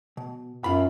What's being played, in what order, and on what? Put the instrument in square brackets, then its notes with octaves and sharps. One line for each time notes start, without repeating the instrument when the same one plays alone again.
[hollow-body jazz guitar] B2
[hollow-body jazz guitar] B1 F4 B5 [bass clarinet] F#2